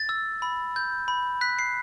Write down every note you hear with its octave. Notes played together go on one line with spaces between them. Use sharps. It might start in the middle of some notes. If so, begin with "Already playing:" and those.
Already playing: A6
E6
B5
G6
B5
F#6 B6
C7